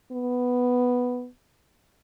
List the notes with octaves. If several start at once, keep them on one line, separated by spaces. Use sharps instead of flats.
B3